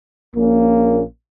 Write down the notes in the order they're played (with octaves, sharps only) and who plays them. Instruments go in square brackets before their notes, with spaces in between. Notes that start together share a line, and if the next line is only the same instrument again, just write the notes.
[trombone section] A#1 A#2 A#3 C#4